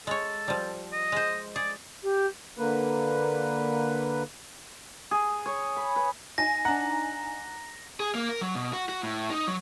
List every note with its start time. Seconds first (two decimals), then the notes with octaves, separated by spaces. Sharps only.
0.07 G#3 A4 C#5
0.48 F3 G3
0.92 D#5
1.12 G#3 C5
1.56 G#4 D5
2.03 G4
2.58 D3 A#3 B4
5.11 G#4
5.46 C#5
5.76 B5
5.96 B4
6.38 D#4 G#5 A#6
6.65 D4 F#5 A#5
8.00 G#4
8.15 A#3
8.29 A#4
8.41 F#3
8.55 B2
8.73 F#4
8.89 F#4
9.03 A2
9.30 D#4
9.47 F#3